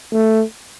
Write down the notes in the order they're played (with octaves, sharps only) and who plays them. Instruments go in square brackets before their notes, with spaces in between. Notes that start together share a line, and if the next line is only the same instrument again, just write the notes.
[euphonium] A3